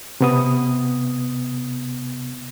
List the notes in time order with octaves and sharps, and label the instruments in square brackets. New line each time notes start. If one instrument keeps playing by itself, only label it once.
[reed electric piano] C3 B3 D#6